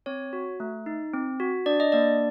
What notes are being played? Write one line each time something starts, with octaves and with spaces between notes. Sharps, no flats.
C4 C#5
F#4
A3
D#4
C4
F#4
D4 D5
D#5
A#3 D5